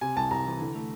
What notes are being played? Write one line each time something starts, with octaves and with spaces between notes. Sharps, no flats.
C3 G#5
C2 A5
C2 A#5
E3
D3
A3